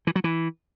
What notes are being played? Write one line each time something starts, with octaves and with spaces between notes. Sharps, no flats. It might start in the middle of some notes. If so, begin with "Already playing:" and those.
E3
F#3
E3